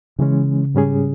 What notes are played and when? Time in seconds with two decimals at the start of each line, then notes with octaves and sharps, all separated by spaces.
0.19 C#3 E3 G#3 C#4
0.74 G#2 G3 C#4 G#4